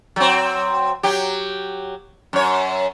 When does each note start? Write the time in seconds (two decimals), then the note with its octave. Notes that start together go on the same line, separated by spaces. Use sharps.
0.16 F#3 C4
1.03 F#3 G4
2.33 F#2 C#5